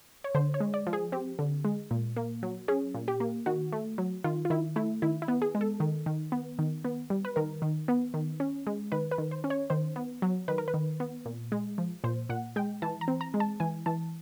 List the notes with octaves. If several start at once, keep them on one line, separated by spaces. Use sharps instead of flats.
C#5
D3 C5
C#5
G#3
D5
F3
G#4
C4 G4
D3
G#3
A#2
A#3
F#3
C#4 G#4
A#2
G4
A#3
D#3 F#4
A3
F#3
D#3 F4
F4
D#3 E4
A3 E4
D#3 E4
E4
B3
G#4
G#3
A4
D#3
D#3
B3
D#3
B3
G3
B4
D#3 A#4
D#3
B3
D#3
C#4
G#3
D#3 B4
B4
D#3
C5
C#4
C#5
D#3 C5
B3
F#3
D#3 B4
A#4
B4
D#3
B3
A#2
G#3
F3
A#2 C5
A#2 F#5
G#3 G5
E3 A5
A#5
C4
A#5
G#3
A5
E3 G#5
E3 A5